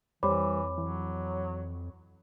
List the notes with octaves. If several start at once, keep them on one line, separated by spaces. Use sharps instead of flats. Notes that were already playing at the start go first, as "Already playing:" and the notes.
F2 E3 G3 C5 C#5 B5 D6
E3 F#3